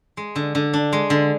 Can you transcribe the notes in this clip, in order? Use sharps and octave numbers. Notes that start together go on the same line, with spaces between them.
G#3
D3
D3
D4
G#3
D3